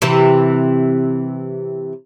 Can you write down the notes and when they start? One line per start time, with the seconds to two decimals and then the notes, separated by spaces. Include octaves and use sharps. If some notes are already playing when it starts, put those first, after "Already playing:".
0.02 C3 E3